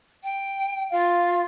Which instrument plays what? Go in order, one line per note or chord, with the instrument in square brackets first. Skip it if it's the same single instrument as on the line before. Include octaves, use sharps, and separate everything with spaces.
[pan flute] G5
[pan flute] F4 [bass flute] F5